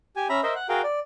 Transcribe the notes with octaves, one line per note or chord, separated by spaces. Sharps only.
G4 G#5
C#4 E5 A#5 B5
A#4 C5 D#5 E5
F#5
F#4 G#4 A#4 F5 G5
D5